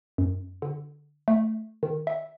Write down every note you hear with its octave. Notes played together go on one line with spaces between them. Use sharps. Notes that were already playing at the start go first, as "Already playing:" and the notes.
F#2
D3
A3
D#3
E5